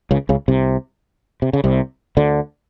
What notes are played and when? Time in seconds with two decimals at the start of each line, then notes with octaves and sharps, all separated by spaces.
0.11 C#2 C#3
0.29 C#2 C#3
0.48 C2 C3
1.42 C3
1.53 C#3
1.64 C2 C3
2.17 D2 D3